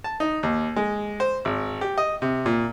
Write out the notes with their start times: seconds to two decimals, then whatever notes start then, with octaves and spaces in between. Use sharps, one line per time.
0.04 A5
0.20 D#4
0.43 D#2
0.76 G#3
1.20 C5
1.45 G#1
1.81 G4
1.98 D#5
2.22 C3
2.46 A#2